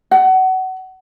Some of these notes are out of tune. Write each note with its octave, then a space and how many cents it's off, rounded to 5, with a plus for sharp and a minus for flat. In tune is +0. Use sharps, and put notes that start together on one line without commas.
F#5 +25